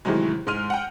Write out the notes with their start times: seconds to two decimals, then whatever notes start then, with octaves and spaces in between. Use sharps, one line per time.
0.05 A2 C3 D#3 E3 F#3 G#3
0.47 G#2 G#3 C6 F6 D#7 F7
0.70 F#5 G5